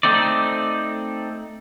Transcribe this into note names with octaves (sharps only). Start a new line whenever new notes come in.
A3 C4 D#4 D5